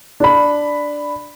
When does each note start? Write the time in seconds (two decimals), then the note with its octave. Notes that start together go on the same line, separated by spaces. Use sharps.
0.20 D4 B5